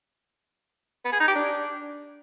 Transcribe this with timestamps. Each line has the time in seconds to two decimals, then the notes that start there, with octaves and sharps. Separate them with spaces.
1.05 B3
1.13 G#4
1.20 D#4
1.28 G4
1.35 D4